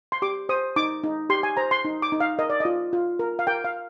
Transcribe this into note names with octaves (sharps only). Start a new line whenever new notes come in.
C6
G4 D6
C5 D#6
D#4 D6
D#4
G4 C6
G#5
C5 A#5
C6
D#4
D6
D#4
F5
A#4 D#5
D5
F4 D#5
F4
A#4
F5
A#4 G5
F5